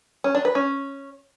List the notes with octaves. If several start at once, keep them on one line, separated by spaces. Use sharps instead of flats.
C#4
D4
B4
C#4